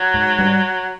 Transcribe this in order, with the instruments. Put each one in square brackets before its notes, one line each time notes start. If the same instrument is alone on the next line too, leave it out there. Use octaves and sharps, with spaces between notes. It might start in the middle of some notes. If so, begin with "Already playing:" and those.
Already playing: [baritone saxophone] F#3
[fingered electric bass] G#2
G3